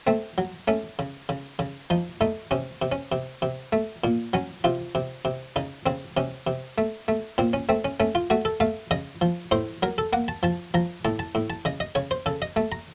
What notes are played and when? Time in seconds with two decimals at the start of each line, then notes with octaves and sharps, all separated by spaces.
0.07 A3 C4
0.38 F#3
0.68 A3 C#4
0.99 C#3
1.29 C#3
1.59 C#3
1.90 F3 D#4
2.21 A3 D#4
2.51 C3 C#4
2.82 C3
2.92 C#4
3.12 C3
3.42 C3
3.73 A3
4.04 A#2
4.33 F#3 C#4
4.64 C3 F4
4.95 C3
5.25 C3
5.56 C#3 D#4
5.86 C#3 C4
6.17 C3 C#4
6.47 C3
6.78 A3
7.08 A3
7.38 A#2 C4
7.53 C#4
7.69 A3 C4
7.85 C#4
8.00 A3 C#4
8.15 F4
8.30 A3 F#4
8.45 A4
8.60 A3 F5
8.91 C#3 D#5
9.21 F3
9.51 A2 C5
9.83 F#3 A#4
9.98 A4
10.13 A#3 F#5
10.28 A5
10.43 F3 A5
10.74 F3 A#5
11.05 A2 A5
11.19 A5
11.35 A2
11.50 A5
11.65 C#3 D#5
11.80 D#5
11.95 C#3 C#5
12.11 C5
12.26 C#3 A4
12.42 D#5
12.56 A3 A5
12.72 A#5